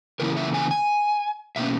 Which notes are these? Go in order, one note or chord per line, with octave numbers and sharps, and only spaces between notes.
C#3 E3 A#3 C#4 E4 A#4
E5
G#5
G#5
B2 A#3 C#4 E5